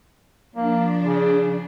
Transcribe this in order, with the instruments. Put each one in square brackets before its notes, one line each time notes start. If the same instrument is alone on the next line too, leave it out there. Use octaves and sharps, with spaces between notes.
[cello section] F3 D4 [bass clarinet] A#3
[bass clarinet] C#3